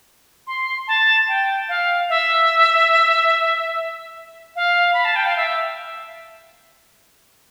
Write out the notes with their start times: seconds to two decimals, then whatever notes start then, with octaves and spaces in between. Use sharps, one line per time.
0.47 C6
0.88 A5
1.28 G5
1.69 F5
2.09 E5
4.56 F5
4.94 B5
5.05 A5
5.16 G5
5.26 F5
5.37 E5